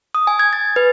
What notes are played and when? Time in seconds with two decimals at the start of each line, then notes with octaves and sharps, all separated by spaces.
0.15 D#6
0.27 G#5
0.39 G#6
0.53 A6
0.76 B4